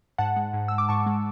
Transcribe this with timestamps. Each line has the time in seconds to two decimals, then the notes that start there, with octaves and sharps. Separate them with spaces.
0.18 G#2 F#5 A5
0.36 G#3
0.53 G#2
0.68 G#3 E6
0.78 D6
0.89 G#2 A5 C#6
1.06 G#3